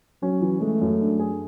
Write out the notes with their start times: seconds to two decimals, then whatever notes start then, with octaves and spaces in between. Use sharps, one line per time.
0.22 F#3 C#4
0.41 E3
0.61 G#3 A3
0.81 F#2
1.01 D4
1.19 G#4